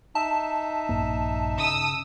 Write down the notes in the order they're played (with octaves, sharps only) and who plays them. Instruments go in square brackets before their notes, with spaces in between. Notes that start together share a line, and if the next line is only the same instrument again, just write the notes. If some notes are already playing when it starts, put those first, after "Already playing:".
[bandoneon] D#4 E5 [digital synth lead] A5
[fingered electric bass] A#1 G2 A#3
[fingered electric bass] C#3 [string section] D#6 E6